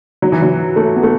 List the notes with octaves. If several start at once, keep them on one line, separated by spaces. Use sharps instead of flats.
F#3
E3
F#3
A3
B3
A3